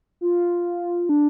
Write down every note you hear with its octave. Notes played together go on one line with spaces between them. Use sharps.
F4
D4